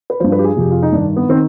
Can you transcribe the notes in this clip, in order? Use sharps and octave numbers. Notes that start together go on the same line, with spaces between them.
B4
G2 F3 C5
B4
G4
G#4
F2 C3 F3 G4
F4
D#4
G2 D#3 D4
B3
D#3 C4